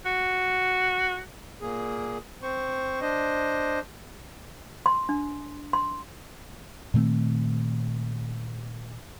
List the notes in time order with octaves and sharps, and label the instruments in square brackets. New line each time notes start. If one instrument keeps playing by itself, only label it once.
[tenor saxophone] F#4
[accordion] A#2 A#3 G#4
C4 C5 C#6
D4 C5 D#5
[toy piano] C6
D4
C6
[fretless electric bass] A#2 D#3 A3 C4